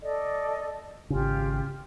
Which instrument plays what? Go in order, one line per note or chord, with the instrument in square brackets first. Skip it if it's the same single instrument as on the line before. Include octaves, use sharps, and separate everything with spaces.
[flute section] A4 D5 D#5
[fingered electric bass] G#1 C#3 [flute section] F4 G4